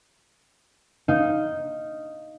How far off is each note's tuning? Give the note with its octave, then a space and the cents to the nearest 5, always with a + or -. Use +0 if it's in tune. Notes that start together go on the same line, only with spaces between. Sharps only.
D#4 +0 F5 -5